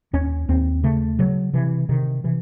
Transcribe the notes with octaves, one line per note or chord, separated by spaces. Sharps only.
D#2 C#4
D#2 C4
C#3 A3
C#3 F#3
C3 E3
C3 D#3
C3 E3